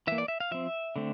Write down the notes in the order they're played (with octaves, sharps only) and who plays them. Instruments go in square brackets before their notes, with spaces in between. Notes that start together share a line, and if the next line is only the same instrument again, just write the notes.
[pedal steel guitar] E3 A#3 E5
D5
E5
F5
F3 C4 E5
D3 A3 C4